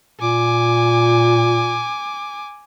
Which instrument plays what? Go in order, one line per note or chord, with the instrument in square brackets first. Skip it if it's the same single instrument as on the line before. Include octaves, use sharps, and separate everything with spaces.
[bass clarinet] A#2 [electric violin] G#5 D6